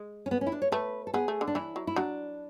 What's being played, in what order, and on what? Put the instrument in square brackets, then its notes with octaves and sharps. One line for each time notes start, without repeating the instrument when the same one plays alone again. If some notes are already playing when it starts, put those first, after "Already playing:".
Already playing: [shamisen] G#3
[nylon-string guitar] C#4
B3
C#4
E4
D4
C#5
[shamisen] A3 [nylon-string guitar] B4
[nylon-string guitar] A4
[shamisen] B3 [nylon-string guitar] G#4
[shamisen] A3
D3
[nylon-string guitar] D4
[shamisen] E3 [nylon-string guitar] E4
[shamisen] F#3
[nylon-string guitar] E4
[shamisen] F#3 [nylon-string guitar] D4